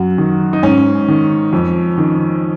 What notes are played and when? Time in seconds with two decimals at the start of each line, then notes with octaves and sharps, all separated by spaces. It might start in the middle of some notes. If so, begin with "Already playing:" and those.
Already playing: F#2 F#4
0.18 D#3
0.53 D#4
0.63 G#2 C#4
1.08 D#3
1.53 F2
1.98 D#3